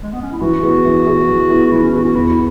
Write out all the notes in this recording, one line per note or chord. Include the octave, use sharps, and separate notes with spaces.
G#3
B3
C#4
E4
E3 F#4
B3 E4 G#4
E3
B3 E4 G#4
E3
B3 E4 G#4
F#4
E3 E4
C#4
B3 E4 F#4 G#4
F#4
E2 E4
E4